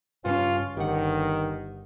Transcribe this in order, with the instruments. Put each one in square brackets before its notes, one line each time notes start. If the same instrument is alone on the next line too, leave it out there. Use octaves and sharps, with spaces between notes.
[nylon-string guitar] G2 C#3 [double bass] C#4 [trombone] F4
[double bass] G1 [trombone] D#3 [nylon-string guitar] G4 F#5